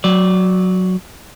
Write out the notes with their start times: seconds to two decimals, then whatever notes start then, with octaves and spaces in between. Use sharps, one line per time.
0.04 F#3 D5